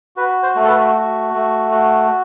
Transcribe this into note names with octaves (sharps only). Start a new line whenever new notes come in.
F#4 B4
C5
A3
A4
B4
F#4
A3
F#4